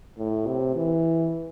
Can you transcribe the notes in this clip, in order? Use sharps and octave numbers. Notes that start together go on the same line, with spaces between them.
A2
C3
E3